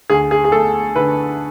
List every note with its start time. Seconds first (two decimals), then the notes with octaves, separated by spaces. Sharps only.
0.10 D2 G#4
0.31 G#4
0.44 G#4
0.52 A3 A4
0.95 D3 B4